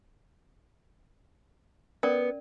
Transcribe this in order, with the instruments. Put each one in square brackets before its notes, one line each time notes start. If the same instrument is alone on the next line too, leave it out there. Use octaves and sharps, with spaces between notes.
[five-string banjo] B3 [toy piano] C#4 A#4 D5